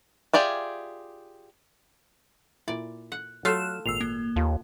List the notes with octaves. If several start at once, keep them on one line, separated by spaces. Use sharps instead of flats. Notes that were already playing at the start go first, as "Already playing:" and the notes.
F4 G4 G#4 D5 E5
A#2 E4 D5
F#5
F#3 A3 F4 F5 F6 F#6 E7
G#1 A#2 E6 C7 F7
A#3
D#2 F4 A4